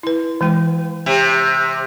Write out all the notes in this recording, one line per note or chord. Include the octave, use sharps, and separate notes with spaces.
E4 B4
E3 G#3 G5
C3